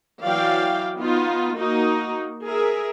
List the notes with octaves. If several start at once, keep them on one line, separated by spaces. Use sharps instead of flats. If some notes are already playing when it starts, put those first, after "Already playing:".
E3 F#3 D5 F5 G5
B3 D#4 F4
A#3 D#4 F#4
G#4 A#4 E5